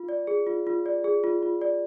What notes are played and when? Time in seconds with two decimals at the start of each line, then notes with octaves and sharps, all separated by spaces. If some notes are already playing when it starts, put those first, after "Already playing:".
Already playing: F4
0.09 D5
0.27 G#4
0.47 F4
0.67 F4
0.86 D5
1.04 G#4
1.24 F4
1.42 F4
1.62 D5